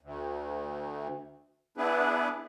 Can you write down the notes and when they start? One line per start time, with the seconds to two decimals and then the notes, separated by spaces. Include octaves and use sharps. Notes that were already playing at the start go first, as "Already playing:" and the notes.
0.01 D2
1.77 B3 D4 E4 G#4 B4